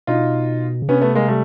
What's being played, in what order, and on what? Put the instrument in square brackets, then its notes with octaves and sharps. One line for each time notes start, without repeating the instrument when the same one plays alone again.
[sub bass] B2 [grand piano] D#4 F4
[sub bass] C#3
[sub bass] C3 [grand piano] B3 C#4
[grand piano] A3 B3
G#3 A#3
G3 A3